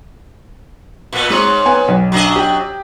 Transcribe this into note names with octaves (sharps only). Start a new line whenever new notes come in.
A#2 B3
G#2 G#3 C#5
B3 G#5
B1
F#3 D4 D#5
G4 G5